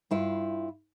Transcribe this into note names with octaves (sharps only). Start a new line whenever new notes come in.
G2 E4 F4